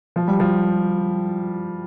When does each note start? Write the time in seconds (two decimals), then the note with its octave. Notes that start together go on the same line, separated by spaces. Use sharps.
0.16 F3
0.27 G3
0.40 F3